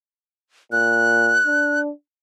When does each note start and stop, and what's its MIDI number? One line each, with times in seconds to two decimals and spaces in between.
0.72 1.41 46
0.72 1.80 90
1.47 1.91 62